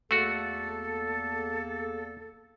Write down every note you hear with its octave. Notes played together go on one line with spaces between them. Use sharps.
E2 A3 A#3 F#4 A4